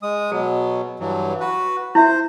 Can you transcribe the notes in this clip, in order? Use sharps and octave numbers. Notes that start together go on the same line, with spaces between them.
G#3 D#6
B2 F#3 G#4
G2 E3 F#3
F#4 B4
E4 C5 E5